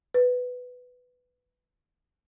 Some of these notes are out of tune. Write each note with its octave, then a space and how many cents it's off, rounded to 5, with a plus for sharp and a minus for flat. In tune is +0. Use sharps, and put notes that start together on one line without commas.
B4 +10